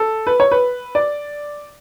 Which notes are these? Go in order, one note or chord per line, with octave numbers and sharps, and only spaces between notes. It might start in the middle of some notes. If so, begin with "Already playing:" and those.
Already playing: A4
B4
C#5
B4
D5